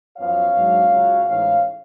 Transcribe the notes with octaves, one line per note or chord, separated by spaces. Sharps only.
F#2 F3 B3 C#5 F5
G#2 F#3 B3 D4
C#2 C#3 F#3 C#4
A1 G#2 G#3 C#5 F5